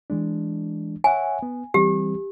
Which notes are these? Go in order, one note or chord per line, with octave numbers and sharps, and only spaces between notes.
E3 G#3 D4
C#5 E5 F#5 G#5
B3
E3 G3 C4 G4